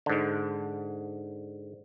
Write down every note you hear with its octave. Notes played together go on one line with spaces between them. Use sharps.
G#2 D3